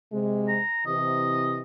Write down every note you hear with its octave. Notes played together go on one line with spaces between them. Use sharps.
C3 G#3
A#5
C3 E3 D#5